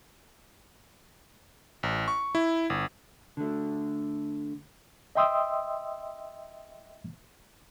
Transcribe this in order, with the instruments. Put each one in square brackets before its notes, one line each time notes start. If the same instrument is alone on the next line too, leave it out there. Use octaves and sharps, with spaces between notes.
[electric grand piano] A1
C#6
E4
G1
[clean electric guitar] D3 A3
[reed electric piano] D#5 E5 G5 C6 D#6 E6